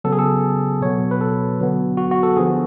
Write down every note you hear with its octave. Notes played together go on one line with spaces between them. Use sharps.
C#3 F#3 B3 A4
G#4
A4
B2 F#3 B3 C#5
B4
A4
D3 F#3 B3
F#4
F#4
A4
D3 F3 B3 G#4